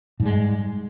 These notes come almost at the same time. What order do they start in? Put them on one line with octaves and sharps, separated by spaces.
G#2 G3 G#3